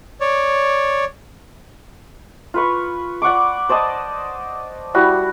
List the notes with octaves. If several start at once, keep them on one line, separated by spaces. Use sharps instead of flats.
C#5 D5
F4 B4 C#6
D5 F#5 C#6 D6
C5 D5 D#5 A5
G3 E4 F#4